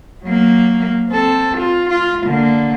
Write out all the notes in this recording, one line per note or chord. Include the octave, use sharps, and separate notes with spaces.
F#3 A#3
C4 A4
F4
F4
D3 A#3